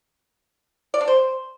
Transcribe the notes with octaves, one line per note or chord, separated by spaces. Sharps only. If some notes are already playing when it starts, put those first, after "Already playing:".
D5
D4
C5